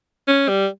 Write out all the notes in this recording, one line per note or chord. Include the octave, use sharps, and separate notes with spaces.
C#4
G3